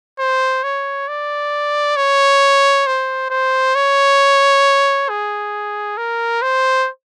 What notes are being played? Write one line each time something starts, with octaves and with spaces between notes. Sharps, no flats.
C5
C#5
D5
C#5
C5
C5
C#5
G#4
A#4
C5